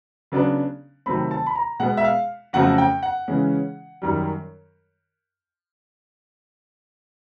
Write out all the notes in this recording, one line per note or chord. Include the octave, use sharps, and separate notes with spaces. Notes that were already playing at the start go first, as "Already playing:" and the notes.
C#3 F#3 B3 D4
C3 D#3 F#3 A3 C4 B5
A5
B5
A#5
B2 G#3 B3 F#5
E5
F5
F2 C#3 F#3 A3 C4 F#5
G5
F#5
C#3 E3 G#3 C#4
F#2 D#3 G3